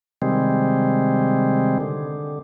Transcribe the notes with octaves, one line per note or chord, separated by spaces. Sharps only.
C3 D#3 G3 G#3 C4
D3